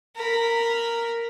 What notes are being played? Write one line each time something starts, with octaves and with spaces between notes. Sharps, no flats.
A#4 B5